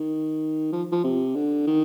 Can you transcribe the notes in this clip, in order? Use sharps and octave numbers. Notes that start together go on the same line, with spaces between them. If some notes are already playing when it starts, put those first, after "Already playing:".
Already playing: D#3
F3
F3
C3
D3
D#3